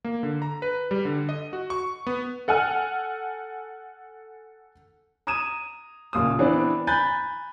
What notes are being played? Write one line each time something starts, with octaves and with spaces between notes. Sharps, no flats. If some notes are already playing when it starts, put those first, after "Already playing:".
A#3
D3
A#5
B4
G3
D3
D#5
F#4
C#6
B3
A4 F#5 G#5 F6
A#5 D#6 G#6 D#7 E7
F#1 A#2 D#6
E3 B3 C4 D4 D5
G#5 A#5 B5 F#6 G6 A6